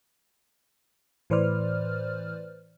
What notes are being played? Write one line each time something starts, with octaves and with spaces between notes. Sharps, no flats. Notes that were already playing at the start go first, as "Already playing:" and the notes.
A2 E3 B4 C5 D5 F6